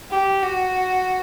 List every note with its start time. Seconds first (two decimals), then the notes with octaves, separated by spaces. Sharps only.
0.11 G4
0.43 F#4